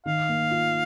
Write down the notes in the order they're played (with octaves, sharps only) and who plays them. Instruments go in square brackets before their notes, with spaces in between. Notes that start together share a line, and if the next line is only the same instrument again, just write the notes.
[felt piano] D#3 [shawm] F5
[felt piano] A#3
F4